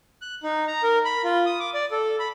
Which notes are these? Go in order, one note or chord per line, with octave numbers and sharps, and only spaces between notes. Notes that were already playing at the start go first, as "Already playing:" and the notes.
F#6
D#4
A#5
A#4
B5
F4
D#6
D6
D5
A4
B5